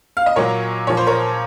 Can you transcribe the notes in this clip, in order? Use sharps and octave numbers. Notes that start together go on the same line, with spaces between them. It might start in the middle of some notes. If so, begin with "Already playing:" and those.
F5
D#5
A#2 F#3 A#4 C#5
A#2 F3 C#5
C5
A#4 C#5